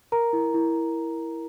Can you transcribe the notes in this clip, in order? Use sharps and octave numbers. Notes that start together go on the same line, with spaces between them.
A#4 A#5
E4
E4